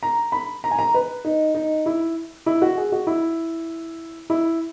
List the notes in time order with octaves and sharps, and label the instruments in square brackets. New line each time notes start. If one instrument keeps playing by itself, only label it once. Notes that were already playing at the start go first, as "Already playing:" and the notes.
[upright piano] A#5
B5
A#5
G#5
A#5
B4
D#4
D#4
E4
E4
F#4
G#4
F#4
E4
E4